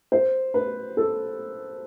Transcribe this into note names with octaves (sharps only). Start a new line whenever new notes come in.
C5
B4
A4